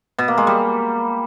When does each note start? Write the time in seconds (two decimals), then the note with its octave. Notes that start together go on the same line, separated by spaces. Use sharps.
0.18 B2
0.28 A#3
0.38 G#3
0.47 G3